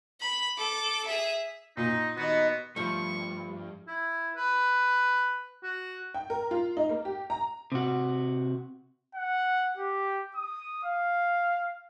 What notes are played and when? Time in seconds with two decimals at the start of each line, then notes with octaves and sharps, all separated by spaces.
0.20 B5
0.57 A4 D6
1.07 G#4 E5
1.77 A#2 D#4
2.17 D#2 B3 D#4 F#4
2.76 G2 F3 A3 C#6
3.88 E4
4.36 B4
5.63 F#4
6.14 G5
6.30 A#4
6.51 F4
6.77 D#4
6.90 A#3
7.05 G4
7.30 A#5
7.72 C3 F#4
9.15 F#5
9.77 G4
10.36 D#6
10.84 F5